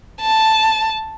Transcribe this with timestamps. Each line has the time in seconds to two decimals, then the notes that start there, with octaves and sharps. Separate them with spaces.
0.21 A5